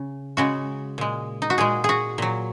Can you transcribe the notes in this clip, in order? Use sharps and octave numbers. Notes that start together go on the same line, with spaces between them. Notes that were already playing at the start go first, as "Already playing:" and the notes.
Already playing: C#3
C#3 G#3 F#4
A#2 G#3
D#4
F#4
A#2 G#3 G#4
F#4 G#4
A#2 F#3